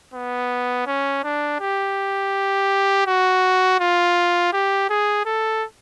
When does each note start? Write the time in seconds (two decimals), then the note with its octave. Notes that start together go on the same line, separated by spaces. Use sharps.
0.14 B3
0.87 C#4
1.24 D4
1.60 G4
3.06 F#4
3.80 F4
4.53 G4
4.89 G#4
5.26 A4